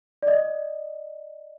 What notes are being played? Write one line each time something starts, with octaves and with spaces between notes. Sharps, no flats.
D5
D#5